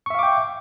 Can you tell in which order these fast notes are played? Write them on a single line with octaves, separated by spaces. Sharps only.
C#6 E5 F5 D6 G5